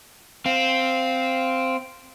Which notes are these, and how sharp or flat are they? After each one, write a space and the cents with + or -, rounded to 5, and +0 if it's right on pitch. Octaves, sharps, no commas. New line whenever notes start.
C4 -5 F5 +0